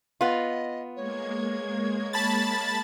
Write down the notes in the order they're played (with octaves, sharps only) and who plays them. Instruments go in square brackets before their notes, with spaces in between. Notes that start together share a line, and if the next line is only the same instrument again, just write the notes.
[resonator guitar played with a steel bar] B3 F4 [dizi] D#5
[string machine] G#3 A#3 G#6 [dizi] C#5
[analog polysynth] A5 B5 A6